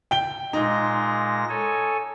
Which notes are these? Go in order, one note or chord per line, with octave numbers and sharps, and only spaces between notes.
G5 G7
A#2 G#3 D#4 A#6
A4 C#5 G#5